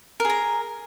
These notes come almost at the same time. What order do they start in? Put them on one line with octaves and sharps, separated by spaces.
A#4 G#4 A#5